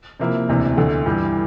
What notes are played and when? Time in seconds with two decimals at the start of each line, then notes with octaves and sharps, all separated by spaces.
0.20 C3 F3 A#3 E4
0.48 E1 D2 C3 E3
0.77 D2 D3 A3
1.06 G2 E3 G3